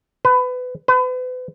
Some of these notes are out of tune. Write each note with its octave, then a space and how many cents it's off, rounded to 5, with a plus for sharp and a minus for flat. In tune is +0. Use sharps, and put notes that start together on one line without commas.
B4 +25
B4 +40